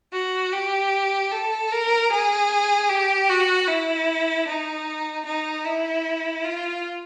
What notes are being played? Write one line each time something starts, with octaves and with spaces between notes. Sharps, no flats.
F#4
G4
A4
A#4
G#4
G4
F#4
E4
D#4
D#4
E4
F4